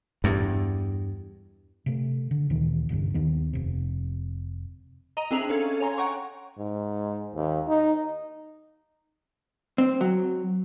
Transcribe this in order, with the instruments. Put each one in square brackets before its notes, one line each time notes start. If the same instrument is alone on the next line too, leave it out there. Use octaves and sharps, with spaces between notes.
[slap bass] E2 G2
[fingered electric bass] C3 A3
D3
D2 A#2 D#3 E3
E1 C2 G2 D3
D#2 D#3 B3
F1 C3
[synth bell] D#5 A#5 D#7
C4 D4 G#4 E5 F7 F#7
C#4 A4 F5 G#6
C#5 G#5 A#5 C6
F#5 G5 A#5 C#6
[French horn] G#2
D#2
D#4
[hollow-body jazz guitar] C4
F#3